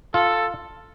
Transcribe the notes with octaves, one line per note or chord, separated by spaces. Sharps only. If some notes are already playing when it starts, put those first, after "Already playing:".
F4 A4